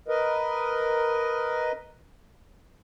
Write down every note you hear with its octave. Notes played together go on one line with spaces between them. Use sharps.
A#4 B4 D#5